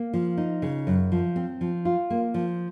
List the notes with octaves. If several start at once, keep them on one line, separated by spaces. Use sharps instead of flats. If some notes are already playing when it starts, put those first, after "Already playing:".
Already playing: A#3
F3
D#4
C#3
F#2
F3
C4
F3
F4
A#3
F3